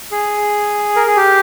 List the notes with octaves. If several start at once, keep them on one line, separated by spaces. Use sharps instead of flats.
G#4
A#4
G#4
G4